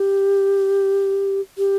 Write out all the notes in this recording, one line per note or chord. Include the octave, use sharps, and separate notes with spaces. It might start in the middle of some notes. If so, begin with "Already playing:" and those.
Already playing: G4
G4